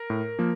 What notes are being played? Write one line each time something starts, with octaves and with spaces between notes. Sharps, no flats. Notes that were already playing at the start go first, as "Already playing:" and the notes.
Already playing: A#4
A2
F3 A#3